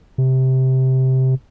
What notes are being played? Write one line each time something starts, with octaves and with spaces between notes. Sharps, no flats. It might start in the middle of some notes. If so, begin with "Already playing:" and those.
C3